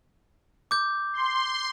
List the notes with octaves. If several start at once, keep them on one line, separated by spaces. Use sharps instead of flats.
D6 G6
C6